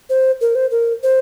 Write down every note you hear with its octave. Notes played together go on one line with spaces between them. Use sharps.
C5
A#4
C5
A#4
C5